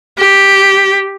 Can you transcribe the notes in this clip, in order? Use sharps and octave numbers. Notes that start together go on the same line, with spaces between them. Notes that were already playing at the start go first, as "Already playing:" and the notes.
G4